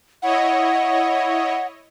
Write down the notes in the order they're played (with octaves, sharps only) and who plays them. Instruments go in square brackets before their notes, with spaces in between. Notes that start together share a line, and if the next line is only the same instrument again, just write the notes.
[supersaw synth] E4 C#5 D#5 [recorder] F#5